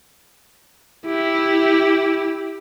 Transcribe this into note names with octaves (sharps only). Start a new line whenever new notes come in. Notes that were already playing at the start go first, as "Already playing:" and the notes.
E4 G4